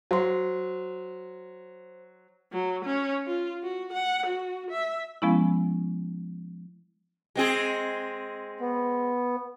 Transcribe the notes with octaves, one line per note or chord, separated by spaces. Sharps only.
F#3 C5 C6
F#3
C#4
F4
F#4
F#5
F#4
E5
F3 G#3 B3 C#4 E4
G#3 C4 G#4
B3